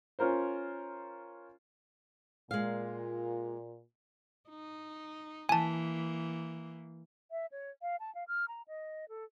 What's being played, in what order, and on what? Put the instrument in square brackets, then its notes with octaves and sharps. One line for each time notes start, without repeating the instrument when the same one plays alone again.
[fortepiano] C#4 F4 A#4 C5
[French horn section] A#2 [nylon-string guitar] G#3 F5
[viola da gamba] D#4
[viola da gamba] E3 A#3 [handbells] G#5 A5
[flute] E5
C#5
F5
A5
F5
F6
A#5
D#5
A4